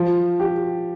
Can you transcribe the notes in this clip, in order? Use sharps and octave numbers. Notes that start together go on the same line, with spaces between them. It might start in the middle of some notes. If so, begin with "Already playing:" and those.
Already playing: F3
G4